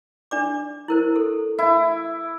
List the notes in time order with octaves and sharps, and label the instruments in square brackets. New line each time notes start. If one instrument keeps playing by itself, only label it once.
[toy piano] D4 D5 D6
E4 A#4 C5
A4
[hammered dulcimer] E4